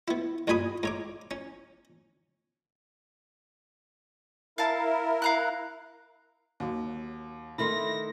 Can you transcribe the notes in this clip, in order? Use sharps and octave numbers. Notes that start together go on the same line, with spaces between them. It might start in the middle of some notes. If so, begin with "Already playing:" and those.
B3 E4
B1 G2 A#2 G#5 B5 D#6
G#2 C#5 D6
C#4
E4 A#4 F5 A5
F5 A#5 F#6
D#2 F#3
D#3 A3 E4 B5 C6 A#6